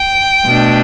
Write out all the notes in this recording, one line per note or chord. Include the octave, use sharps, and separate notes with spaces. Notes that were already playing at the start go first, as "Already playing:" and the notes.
Already playing: G5
B2 A3 D4